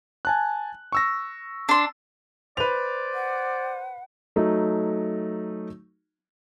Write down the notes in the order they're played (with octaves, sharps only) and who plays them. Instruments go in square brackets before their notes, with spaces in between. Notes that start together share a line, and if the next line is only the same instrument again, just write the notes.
[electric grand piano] G#5 A5 F#6
C#6 E6 A#6
[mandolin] D4 C6
[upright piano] B4 F7 [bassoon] C5 [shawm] D5
[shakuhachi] F#5
[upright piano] F#3 A3 D#4